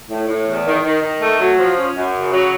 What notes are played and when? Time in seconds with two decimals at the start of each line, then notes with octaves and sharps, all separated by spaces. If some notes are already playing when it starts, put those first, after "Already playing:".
0.09 A2
0.27 A2
0.46 E2
0.65 D#3
0.83 D#3
1.02 D#3
1.20 A3
1.39 F#3
1.58 F3
1.77 C#4
1.95 F#2
2.14 C#3
2.32 F#3